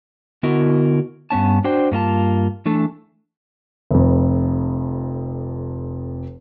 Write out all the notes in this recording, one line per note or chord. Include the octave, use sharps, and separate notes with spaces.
D3 B3 E4 F#4 A#4 D#5
G2 B3 C#4 A5
D4 F#4 C5 G5
G2 A#3 F4 A5
E3 A3 D4 A4
F1 F2